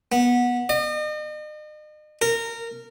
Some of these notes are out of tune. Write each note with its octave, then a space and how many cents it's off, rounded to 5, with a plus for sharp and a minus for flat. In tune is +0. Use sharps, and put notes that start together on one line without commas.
B3 -20
D#5 -40
A#4 -20